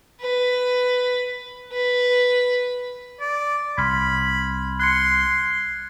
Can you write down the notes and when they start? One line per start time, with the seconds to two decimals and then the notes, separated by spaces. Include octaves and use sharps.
0.21 B4
1.72 B4
3.20 D5
3.78 C2 B5 C6 F6 G#6
4.80 C6 F#6 G#6 C#7